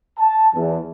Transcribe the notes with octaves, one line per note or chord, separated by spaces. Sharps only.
A5
E2